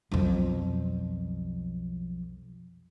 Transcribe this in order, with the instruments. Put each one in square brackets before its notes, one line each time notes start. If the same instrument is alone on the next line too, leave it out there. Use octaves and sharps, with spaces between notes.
[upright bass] B1 F2